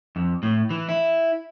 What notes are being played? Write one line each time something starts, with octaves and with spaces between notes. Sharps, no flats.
F2
A2
E3
E4